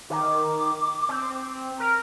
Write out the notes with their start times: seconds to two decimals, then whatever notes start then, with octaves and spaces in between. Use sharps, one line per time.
0.10 D#3 D6
1.09 C4
1.80 A#4 A#5 F6